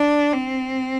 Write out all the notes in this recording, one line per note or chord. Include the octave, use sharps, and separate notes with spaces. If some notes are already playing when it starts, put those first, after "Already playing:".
Already playing: D4
C4